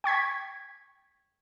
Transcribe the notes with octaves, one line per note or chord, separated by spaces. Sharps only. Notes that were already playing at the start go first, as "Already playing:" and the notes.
G5 C#6 G#6 B6